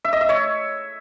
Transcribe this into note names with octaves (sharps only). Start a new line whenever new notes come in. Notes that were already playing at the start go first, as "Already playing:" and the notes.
E5
D#5
E5
C#5